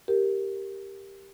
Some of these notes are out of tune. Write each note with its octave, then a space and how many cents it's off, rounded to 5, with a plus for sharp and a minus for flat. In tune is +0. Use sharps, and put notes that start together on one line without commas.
G4 +0 A#4 +0